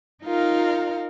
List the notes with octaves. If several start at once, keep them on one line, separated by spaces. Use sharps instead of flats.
D#4 F4 A#4 F5